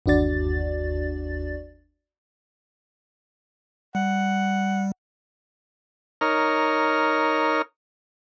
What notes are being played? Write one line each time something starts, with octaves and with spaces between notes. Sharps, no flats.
G1 D#2 D4 F#4 D5 A6
G3 F#5
D#4 A#4 C#5 F6